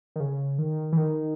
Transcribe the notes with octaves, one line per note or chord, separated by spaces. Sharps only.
D#3
C#3
D#3
E3
D#3